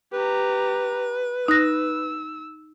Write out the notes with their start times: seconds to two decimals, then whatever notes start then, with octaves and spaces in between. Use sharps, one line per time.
0.13 G4 B4 A#5
1.48 D#4 E6 F#6 A#6